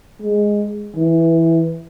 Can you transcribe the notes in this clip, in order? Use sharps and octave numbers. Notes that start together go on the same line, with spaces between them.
G#3
E3